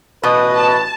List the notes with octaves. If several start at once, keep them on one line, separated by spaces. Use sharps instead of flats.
A1 B2 B4 D#5
A5